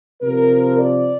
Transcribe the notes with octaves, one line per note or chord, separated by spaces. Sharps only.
C3 F3 A#4
D5